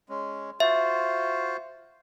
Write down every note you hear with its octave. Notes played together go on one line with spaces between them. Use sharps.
G#3 C#4
F4 F#4 C5 E5